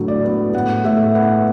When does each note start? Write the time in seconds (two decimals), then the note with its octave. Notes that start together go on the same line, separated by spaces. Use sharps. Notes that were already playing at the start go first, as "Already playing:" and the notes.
Already playing: A2 D3 F#3
0.08 D5
0.24 B3
0.53 A2 F#5
0.84 A2 E5
1.15 B3 F#5